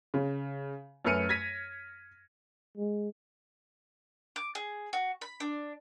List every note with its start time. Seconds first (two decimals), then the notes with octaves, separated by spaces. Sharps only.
0.14 C#3
1.05 F#2 A3 B4 F6 C#7 D#7
1.29 G#6 A#6 B6 D#7
2.77 G#3
4.36 D6
4.55 G#4
4.93 F#4
5.21 B5
5.40 D4